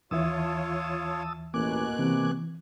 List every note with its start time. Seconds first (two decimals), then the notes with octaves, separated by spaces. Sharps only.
0.11 D#2 E3 F4 C#5 E5 A5 D#6 E6
1.54 A1 B2 A#3 G#5 D6 F#6
1.99 C3 E3